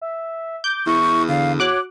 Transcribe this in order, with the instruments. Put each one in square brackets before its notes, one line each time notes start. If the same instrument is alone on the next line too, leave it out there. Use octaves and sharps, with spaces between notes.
[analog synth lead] E5
[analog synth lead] D6 [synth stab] G6
[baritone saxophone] E2 [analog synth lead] E4 [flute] C#6
[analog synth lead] D3 [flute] F5
[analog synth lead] F#4 [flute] C#5 [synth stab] D6 F#6